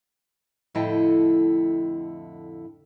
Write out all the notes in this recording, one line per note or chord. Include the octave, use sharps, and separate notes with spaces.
F2 A2 D3 E4 D#5 G5